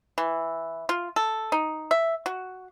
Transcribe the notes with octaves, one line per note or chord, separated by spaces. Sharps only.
E3
F4
A4
D#4
E5
F#4